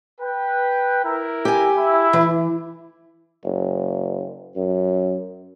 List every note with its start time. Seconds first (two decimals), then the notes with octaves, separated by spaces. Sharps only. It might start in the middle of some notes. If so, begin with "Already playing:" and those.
0.21 B4 G5
1.04 E4 A#4
1.45 G4 G#5
1.77 E4
2.13 E3
3.44 F#1
4.56 F#2